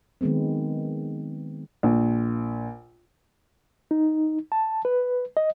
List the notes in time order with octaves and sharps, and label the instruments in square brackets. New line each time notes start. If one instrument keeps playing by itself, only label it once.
[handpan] D#3 F#3 G#3 B3 C4
[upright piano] A#1
[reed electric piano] D#4
A5
B4
D#5